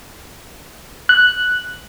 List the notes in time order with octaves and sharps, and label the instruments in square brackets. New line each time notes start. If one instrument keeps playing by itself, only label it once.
[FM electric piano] F#6